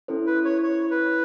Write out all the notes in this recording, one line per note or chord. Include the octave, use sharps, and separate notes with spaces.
C#4 E4 A4 C5
B4
C#5
C#5
B4